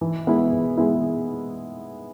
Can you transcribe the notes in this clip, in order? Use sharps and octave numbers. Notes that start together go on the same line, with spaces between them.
E3
G#3 B3 E4
E3
G#3 B3 E4